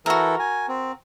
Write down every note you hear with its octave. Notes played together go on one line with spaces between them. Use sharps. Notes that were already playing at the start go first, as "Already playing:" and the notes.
E3 E4 F#4 A4 A#4
G#5
C4